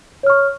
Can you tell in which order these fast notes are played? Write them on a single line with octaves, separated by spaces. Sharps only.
C#5 F6 C#6